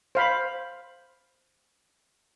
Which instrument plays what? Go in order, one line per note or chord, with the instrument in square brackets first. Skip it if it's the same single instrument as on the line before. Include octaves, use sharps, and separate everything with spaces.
[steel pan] C5 F5 B5